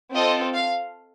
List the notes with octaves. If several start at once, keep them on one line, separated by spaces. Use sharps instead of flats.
C4 F4 A4 D#5
F5